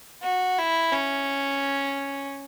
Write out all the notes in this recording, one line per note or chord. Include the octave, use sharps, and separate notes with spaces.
F#4
E4
C#4